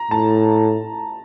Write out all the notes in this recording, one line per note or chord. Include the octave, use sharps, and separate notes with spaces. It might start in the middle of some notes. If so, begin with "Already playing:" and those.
Already playing: A#5
A2 A5